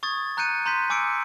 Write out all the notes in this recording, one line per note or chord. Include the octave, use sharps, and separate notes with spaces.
C#6 D#6 G#6 A6
A#5 F#6 G6 C#7 D#7
A#5 C6 G6 B6
G#5 D6 E6 C#7 D7